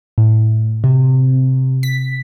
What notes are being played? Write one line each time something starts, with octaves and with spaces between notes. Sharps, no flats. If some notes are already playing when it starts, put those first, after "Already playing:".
A2
C3
B6